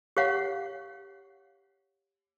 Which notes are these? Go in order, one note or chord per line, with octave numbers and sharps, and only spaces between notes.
G4 C#5 F5 F#5